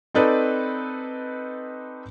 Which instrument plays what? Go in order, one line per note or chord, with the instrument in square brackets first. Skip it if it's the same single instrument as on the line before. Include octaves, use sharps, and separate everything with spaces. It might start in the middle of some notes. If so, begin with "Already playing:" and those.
[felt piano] C4 D#4 A4 B4 D5